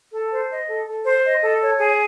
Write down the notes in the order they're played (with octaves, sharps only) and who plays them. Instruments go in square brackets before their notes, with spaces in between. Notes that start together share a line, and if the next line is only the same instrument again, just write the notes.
[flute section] A4
C5
D#5
A4
A4
C5
D#5
A4
C#5
G#4